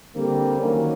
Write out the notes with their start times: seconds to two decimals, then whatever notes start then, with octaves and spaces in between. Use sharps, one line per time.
0.15 D3 G3 A#3 C4
0.60 D#3 F#3 A#3 C#4